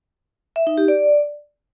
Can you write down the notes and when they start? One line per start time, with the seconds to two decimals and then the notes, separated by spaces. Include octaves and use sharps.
0.56 E5
0.67 D#4
0.78 G4
0.88 D5